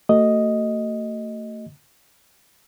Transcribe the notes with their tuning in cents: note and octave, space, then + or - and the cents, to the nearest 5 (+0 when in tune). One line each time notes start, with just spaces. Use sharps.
A3 +40 F#4 +35 D#5 +0